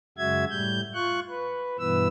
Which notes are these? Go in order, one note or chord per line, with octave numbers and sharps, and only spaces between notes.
F#2 C#3 G#3 F#4 E5 G#6
A2 G3 G6
F4 C#6 F#6
B4
G2 B2 E3 B3 B4 E6